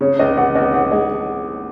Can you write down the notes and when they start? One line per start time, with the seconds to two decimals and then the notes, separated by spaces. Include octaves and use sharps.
0.01 C#3 C#5
0.19 C#2 D#5
0.37 C#2 F#5
0.55 C#2 D#5
0.74 C#2 F#5
0.91 G#3 D#5